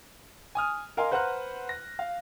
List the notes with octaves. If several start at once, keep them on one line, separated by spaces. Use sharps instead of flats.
G#5 D#6 F6
A#4 D#5 F5 G#5 C6
B4 C5 F#5 A#5 F6 F#6
A#6
F5